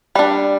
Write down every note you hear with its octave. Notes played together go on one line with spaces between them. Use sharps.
G3 D4 B4